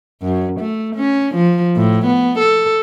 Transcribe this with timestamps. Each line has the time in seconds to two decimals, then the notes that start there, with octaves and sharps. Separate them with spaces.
0.23 F#2
0.60 A3
0.96 C#4
1.35 F3
1.76 A2
2.06 B3
2.39 A4